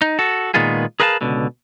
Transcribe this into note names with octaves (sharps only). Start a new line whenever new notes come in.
D#4
F#4 A4
A#2 D#3 G#3 B3 F4 G#4
G#4 A#4 B4 F5 F#5 A5
C#2 B2 D3